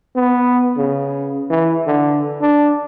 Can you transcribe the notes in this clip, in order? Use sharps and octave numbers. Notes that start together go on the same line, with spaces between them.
B3
C#3
E3
D3
D4